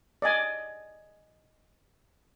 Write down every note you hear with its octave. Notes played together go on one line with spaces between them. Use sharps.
D5 D#5 G#5